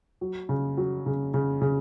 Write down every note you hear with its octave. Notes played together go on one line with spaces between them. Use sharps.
F#3
C#3
F#3
C#3
C#3
C#3